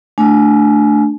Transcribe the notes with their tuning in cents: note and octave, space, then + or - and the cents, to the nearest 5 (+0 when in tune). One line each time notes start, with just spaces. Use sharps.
A3 +0 D4 +0 G#5 +25